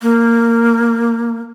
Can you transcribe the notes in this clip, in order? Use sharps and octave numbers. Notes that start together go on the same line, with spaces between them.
A#3